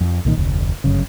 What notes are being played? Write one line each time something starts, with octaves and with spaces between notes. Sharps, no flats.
F2
C2 A#2 D#3
F1 D2
G1 F#2 C#3